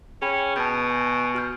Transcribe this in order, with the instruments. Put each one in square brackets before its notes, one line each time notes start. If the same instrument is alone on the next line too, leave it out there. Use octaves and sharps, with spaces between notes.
[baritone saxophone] C#4 [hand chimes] G#4 G5 B5
[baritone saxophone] B2 [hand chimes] A5 G6
[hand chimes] G#5
F#4 F6 G6